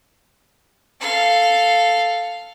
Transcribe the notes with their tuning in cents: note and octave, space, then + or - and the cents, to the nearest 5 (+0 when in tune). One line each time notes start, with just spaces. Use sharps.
A4 +0 F5 +0